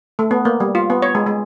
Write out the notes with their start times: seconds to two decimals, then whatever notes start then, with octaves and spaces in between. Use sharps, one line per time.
0.19 A3
0.31 B3
0.45 A#3
0.60 G3
0.75 F4
0.90 B3
1.02 C#5
1.15 G#3
1.26 G#3